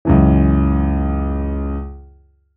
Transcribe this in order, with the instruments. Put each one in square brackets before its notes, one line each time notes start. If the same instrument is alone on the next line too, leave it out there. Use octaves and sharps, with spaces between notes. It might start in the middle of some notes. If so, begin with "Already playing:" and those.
[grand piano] C#2 F#2 E3